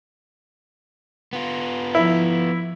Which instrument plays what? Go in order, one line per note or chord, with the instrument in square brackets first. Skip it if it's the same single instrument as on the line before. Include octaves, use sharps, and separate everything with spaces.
[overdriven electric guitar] B3 F4
[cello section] F3 [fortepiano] E4